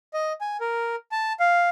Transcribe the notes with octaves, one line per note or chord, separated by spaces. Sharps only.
D#5
G#5
A#4
A5
F5